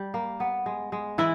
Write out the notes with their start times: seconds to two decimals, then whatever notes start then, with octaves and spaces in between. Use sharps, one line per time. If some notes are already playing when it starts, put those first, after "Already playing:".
Already playing: G3
0.14 A#3
0.40 B3
0.66 G#3
0.92 G#3
1.18 E3 E4